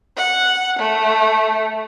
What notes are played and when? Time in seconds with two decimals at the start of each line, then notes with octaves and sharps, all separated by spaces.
0.17 F#5
0.79 A3